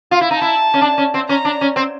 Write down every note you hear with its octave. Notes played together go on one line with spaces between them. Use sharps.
F4
E4
D#4 A5
E4
C#4
D4
C#4
C4
C#4 A#5
D4
C#4
C4